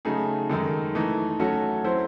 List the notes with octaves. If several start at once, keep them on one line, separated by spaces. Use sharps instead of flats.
C#3 F#3 A3 D#4 G#4
F#2 D#3 G#3 D#4 A4
E3 A3 D#4
F#3 A3 C#4 F#4 A4
F#3 C4 E4 C5